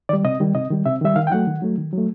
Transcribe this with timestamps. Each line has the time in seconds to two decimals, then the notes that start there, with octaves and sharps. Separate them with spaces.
0.09 D#3 G3 D5
0.25 C3 D#5
0.40 D#3 G3
0.55 C3 D#5
0.71 D#3 G3
0.86 C3 E5
1.01 D#3 G3 E5
1.16 D#3 F5
1.27 G5
1.32 F#3 A3 F#5
1.47 D#3
1.62 F#3 A3
1.78 D#3
1.93 F#3 A3